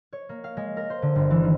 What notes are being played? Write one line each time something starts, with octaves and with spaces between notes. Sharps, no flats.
C#5
A#3
F5
G#3
A#4
C5
D3
G1
E3
D#3